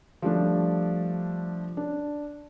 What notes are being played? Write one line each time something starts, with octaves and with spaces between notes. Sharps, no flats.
F3 G3 A3 D4
D4